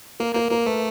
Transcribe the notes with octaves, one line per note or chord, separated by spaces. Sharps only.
A#3 A#4
A#3 A#4
A#3 A#4
A3 B4